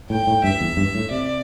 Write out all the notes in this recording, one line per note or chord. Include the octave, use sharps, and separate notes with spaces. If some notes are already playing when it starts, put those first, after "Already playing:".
A2 G5
A2
G2 E5
E2
G2
A2
C3 D5